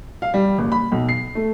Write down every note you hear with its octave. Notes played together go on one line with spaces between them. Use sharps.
F5
G3
F#1
B5
B1
C7
A3